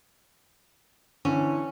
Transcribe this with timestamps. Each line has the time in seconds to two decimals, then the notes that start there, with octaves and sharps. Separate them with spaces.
1.25 D3 E3 C#4